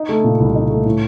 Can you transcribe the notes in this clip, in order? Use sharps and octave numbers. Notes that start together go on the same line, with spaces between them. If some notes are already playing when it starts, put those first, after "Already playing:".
Already playing: D#4
A3
A#2
C2
D#4
A3
A2